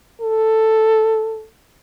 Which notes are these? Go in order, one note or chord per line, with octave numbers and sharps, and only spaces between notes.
A4